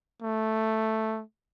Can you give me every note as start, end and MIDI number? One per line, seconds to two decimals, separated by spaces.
0.22 1.22 57